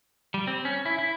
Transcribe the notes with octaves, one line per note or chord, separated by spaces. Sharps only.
G3
C4
C#4
E4
E4